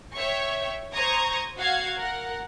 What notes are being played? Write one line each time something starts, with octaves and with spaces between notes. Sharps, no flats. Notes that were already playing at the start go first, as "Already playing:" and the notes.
C#5 E5 G5 C#6
C5 A#5 C#6 D#6 G#6
F#4 F5 F#5 G#6 C7
A#4 F#5